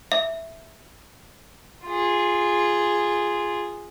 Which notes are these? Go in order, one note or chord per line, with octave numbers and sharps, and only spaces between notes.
E5
F4 G#4